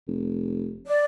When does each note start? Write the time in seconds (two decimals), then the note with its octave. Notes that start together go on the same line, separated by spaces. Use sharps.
0.07 F1
0.86 D5